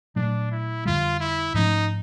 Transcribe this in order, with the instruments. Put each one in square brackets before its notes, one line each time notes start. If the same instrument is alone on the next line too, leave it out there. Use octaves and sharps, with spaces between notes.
[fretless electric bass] A#2 F#3 A3 [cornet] D4
[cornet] E4
[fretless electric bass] F2 D3 G3 [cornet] F4
[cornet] E4
[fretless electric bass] G#2 F3 A3 C#4 [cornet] D#4